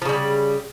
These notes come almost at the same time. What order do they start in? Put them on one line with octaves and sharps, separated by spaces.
F3 C#3 G3